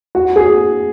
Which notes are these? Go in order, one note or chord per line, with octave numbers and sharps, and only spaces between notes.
F#4
G#4